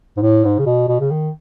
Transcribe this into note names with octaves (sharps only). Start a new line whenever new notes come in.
G#2
A2
G#2
C#3
B2
B2
C#3
D#3